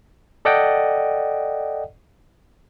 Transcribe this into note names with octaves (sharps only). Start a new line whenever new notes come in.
A4 D5 D#5 F#5 G5